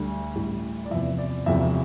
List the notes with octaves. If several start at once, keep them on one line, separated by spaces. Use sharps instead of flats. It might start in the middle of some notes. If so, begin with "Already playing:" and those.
Already playing: D2 D3 G3
A1 A2 G3
D5
E2 C3 F3 E5
D5
E1 E2 C3 F3 E5